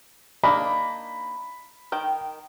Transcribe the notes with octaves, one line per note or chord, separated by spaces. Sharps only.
A#3 D4 D#4 B5
D#3 G5